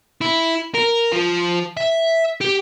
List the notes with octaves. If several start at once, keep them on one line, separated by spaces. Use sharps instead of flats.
E4
A#4
F3
E5
G4